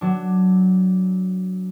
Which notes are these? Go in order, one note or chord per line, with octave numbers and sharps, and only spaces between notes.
F#3 D4